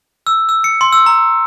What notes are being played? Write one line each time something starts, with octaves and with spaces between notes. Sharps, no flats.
E6
E6
C#7
C6
E6
A#5